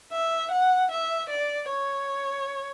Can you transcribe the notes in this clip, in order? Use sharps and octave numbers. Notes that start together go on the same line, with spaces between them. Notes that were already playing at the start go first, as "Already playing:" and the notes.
E5
F#5
E5
D5
C#5